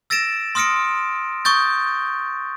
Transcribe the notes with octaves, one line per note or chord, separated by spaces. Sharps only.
E6 A6 A#6 D7 E7
C6 D#6 F6 A#6 C#7 D7
C#6 D#6 G6 A6